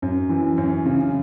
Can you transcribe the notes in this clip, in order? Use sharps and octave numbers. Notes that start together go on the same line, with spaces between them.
F#2
E3
F#2
C#3